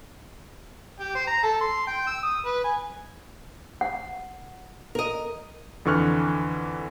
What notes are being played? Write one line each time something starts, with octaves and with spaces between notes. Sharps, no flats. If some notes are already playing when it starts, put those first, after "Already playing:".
G4
C5
A#5
A4
C6
G5
E6
D#6
B4
G#5
F#5
A#4 D#5
F2 D3 E3 C#6 F6 F#6